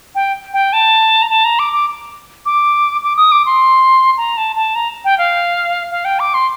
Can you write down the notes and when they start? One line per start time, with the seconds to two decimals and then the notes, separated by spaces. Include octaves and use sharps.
0.15 G5
0.53 G5
0.73 A5
1.22 A#5
1.30 A5
1.45 A#5
1.59 D6
1.73 D6
2.46 D6
3.03 D6
3.17 D#6
3.32 D6
3.46 C6
4.17 A#5
4.37 A5
4.56 A5
4.75 A#5
5.05 G5
5.18 F5
5.91 F5
6.05 G5
6.20 D6
6.34 C6